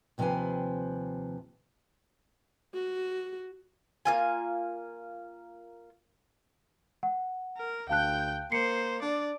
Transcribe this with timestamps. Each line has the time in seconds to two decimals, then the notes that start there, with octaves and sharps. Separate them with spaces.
0.18 D#2 C3 F3 C4 B4 G#5
2.74 F#4
4.05 A#3 F4 G#5
7.03 F#5
7.57 A#4
7.89 D2 F5 G5 A5 F#6 G6
8.52 A#3 C5 C7 C#7
9.02 D4 D5